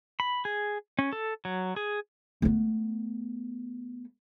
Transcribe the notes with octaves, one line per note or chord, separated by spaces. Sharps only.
B5
G#4
C#4
A4
F#3
G#4
A3 B3